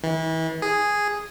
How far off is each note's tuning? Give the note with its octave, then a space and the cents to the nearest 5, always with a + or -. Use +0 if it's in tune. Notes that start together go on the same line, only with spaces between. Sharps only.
E3 -35
G#4 -5